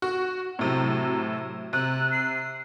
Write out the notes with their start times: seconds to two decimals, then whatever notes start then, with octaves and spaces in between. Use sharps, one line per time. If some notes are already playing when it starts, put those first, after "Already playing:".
0.02 F#4
0.59 A2 C3 F#3
1.73 C3 F#6
2.12 C7